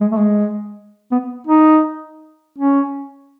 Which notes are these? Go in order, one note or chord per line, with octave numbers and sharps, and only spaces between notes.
G#3
A3
G#3
B3
D#4
C#4